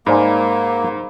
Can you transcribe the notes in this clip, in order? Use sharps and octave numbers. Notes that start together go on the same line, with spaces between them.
G#2 G#3 A#3 C5 D5 A#5 B5